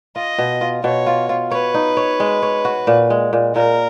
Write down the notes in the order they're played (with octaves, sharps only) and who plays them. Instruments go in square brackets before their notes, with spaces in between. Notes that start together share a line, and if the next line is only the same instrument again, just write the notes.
[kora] F4 [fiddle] D#5
[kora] B2
F4
[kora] B2 [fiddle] C#5
[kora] F4
F4
[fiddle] B4 [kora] C#5
[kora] D#4
C#5
G#3
C#5
F#4
A#2
G#3
A#2
[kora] A#2 [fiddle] A#4